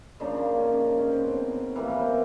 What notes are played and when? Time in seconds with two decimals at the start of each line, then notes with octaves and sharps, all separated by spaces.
0.20 C#3 F3 A#3 D4 D#4
0.59 C#4
0.98 C#4
1.09 C4
1.19 B3
1.29 C4
1.75 E3 G3 A#3 B3
1.89 B3
2.01 C4